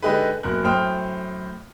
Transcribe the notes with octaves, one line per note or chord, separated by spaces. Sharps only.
D3 G#3 D#4 G4 G#4 B4
F#1 B2 A#4 F#6
F#2 A2 C5 G5 D#6 F6